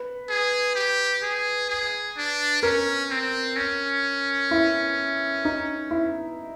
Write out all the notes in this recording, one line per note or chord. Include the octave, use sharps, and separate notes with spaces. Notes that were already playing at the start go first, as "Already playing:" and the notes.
Already playing: B4
G#4
G4
G#4
G#4
D4
C#4 A#4
C4
C#4
E4
D#4
E4